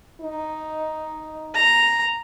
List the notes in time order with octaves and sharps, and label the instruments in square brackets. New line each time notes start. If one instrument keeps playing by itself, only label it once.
[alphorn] D#4
[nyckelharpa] A#5